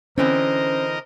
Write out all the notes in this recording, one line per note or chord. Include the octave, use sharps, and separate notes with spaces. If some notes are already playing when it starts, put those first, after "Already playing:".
D3 E3 C4 C#4 A#4 C5 D#5